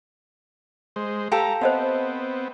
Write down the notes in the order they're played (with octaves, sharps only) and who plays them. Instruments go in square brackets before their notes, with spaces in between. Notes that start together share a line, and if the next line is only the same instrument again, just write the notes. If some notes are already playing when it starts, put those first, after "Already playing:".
[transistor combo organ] G#3 C5
[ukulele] G4 A4 [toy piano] F5 G#5 [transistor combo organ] A#5
[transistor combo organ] B3 C4 [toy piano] C5 D#5 F#5